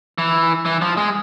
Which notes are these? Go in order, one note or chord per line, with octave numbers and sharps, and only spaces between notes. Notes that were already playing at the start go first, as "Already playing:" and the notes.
E3
E3
F3
G#3